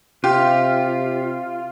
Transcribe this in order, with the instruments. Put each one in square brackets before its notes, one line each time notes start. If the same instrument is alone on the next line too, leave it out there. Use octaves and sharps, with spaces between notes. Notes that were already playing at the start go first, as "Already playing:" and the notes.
[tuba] C3 [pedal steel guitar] F4 [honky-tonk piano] G4